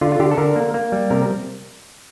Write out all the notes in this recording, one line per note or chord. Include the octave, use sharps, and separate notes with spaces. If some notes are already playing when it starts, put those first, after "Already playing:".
D3 F4
F4
D3 G4
A4
D3 A#4
A#3
A#3
G3
C3 A#4